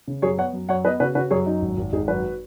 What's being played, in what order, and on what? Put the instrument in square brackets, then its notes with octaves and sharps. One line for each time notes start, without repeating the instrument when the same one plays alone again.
[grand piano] C#3
[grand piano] F#2 [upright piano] G#4 C#5
[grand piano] B3 [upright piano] C#5 F#5
[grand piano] F#2
[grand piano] F#2 [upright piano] C#5 F#5
[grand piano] B3 [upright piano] B4 D#5
[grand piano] C#3 [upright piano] F#4 B4
[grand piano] C#3 [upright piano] F#4 B4
[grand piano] F#2 [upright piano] G#4 C#5
[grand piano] F#2 [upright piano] D#4
[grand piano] G#1
G#1
[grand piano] G#1 [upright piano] D#4 G#4
[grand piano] F#2 [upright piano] F#4 B4